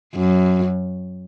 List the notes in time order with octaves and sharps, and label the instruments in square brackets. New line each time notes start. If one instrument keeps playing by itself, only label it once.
[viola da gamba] F#2